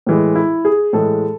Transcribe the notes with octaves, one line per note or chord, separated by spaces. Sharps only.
A2 E3 G#3
E4
G#4
A2 E3 G#3 A4